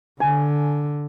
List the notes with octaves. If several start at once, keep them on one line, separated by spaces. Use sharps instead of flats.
D3 G#5